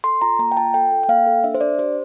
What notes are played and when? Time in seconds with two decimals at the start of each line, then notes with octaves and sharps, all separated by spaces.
0.04 A4 C6
0.22 F4 A#5
0.39 A#3 A#5
0.52 G5
0.57 F4 A5
0.74 A4 G5
0.92 A4
1.03 G5
1.09 A#3 F5
1.27 A4
1.44 D4 E5
1.54 C5
1.61 D4 D5
1.79 G4 C5